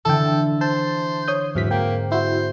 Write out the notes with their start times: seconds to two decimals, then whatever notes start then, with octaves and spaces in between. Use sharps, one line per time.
0.05 D3 E3 A4 G5 A5
0.61 C5 A5
1.28 C#5 D#6 G6
1.55 E2 G#2 E3 F#3 C4 F6 B6
1.71 A#3 G5
2.12 E4 F#4 C5